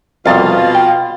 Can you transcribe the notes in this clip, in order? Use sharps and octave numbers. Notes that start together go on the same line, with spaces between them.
C2 F2 B2 F4 F5 A6
G5